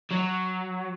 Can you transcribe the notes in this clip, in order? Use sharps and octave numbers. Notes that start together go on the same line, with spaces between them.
F#3